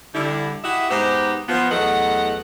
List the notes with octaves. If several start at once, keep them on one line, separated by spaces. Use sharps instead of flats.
D3 G3 E4
E4 F#4 G4 D#5 E5
G#2 B3 D#4 G4 C5
F3 B3
E2 F#3 A3 B3 D#5 F#5